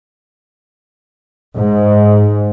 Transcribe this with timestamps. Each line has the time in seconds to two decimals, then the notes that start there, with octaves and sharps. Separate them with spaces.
1.56 G#2